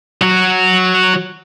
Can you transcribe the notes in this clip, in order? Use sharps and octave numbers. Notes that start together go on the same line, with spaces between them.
F#3 F#4